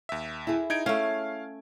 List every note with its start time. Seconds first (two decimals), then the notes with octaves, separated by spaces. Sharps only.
0.09 D#2 E5
0.47 E4 G#4
0.70 D#4 G#6 D7
0.86 A3 C#4 F5